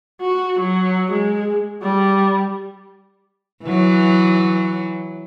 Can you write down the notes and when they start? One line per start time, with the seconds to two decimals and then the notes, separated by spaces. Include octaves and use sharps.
0.21 F#4
0.60 F#3
1.12 G#3
1.82 G3
3.65 E3 F#3